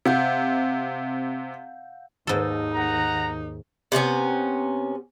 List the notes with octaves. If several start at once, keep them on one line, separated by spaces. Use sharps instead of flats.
C3 F5 F#5 G6
D#2 G#2 D#4 A4
F#5 A#5
C3 A3 B3 C#4